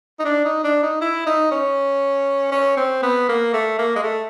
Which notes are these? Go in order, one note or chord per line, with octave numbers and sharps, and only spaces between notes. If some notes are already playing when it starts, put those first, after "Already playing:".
D#4
D4
D#4
D4
D#4
E4
D#4
C#4
C#4
C4
B3
A#3
A3
A#3
G#3
A3